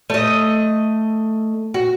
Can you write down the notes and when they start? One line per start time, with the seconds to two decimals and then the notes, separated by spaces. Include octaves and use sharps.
0.10 A3 D#5
1.74 F#4